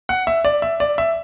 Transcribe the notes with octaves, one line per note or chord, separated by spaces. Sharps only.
F#5
E5
D5
E5
D5
E5